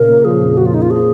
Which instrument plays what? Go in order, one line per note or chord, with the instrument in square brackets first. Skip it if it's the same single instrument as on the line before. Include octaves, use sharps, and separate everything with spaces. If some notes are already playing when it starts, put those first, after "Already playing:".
Already playing: [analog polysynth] A#2 C#3 [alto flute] A#4
[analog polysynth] A#3
[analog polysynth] F3 [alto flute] G#4
[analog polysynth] F2
[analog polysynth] C#3 [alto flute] F#4
[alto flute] F4
[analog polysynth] A#3 [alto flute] D#4
[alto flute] F4
[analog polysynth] F3 [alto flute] G#4